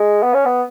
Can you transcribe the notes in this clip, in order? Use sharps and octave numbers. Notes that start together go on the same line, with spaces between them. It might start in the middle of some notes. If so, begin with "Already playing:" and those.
Already playing: G#3
B3
C#4
B3